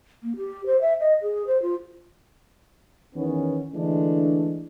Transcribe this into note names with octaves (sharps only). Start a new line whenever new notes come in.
A#3
G4
C5
E5
D#5
G#4
C5
F4
E2 D#3 B3 C#4
D3 E3 G#3 A3 D4